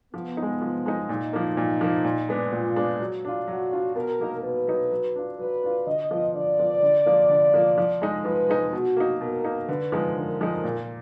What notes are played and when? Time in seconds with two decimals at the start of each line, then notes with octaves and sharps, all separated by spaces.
0.14 F3 B3
0.37 D#4
0.42 G#3
0.62 F3
0.86 G#3 D#4
1.09 A#2 D#4
1.33 F3 A#3
1.57 A#2
1.81 F3 A#3
2.04 A#2
2.29 G#3 B3 D4
2.52 A#2 F4
2.76 G#3 B3 D4
3.00 F#3
3.25 D4 F4
3.48 F#3 F#4
3.72 D4 F4
3.95 B2 A#4
4.19 F#3 A#3 D#4
4.43 B2 B4
4.67 F#3 A#3 D#4
4.91 F#3
5.16 D4 F4
5.39 F#3 B4
5.63 D4 F4
5.86 D3 D#5
6.11 F3 B3 F4
6.34 D3 D5
6.59 F3 B3 F4
6.82 D3
7.06 F3 A#3 F4
7.29 D3
7.54 F3 A#3 F4
7.78 F3
8.02 G#3 D#4
8.25 F3 B4
8.49 G#3 D#4
8.73 B2 F#4
8.97 A#3 D#4
9.21 B2 A#4
9.45 A#3 D#4
9.68 D3 B4
9.92 F3 G#3 D#4
10.16 D3 A#4
10.41 F3 G#3 D#4
10.64 A#2